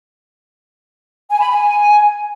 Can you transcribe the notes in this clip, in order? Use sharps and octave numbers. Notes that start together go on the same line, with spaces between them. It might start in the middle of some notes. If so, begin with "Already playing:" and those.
G#5
B5
G#5